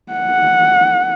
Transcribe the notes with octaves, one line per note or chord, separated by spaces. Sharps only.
F#5